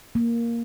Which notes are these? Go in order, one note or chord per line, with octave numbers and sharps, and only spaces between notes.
A#3